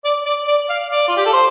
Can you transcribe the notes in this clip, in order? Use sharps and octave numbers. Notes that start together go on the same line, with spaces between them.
D5
D5
D5
F5
D5
F4
G4
A4
C5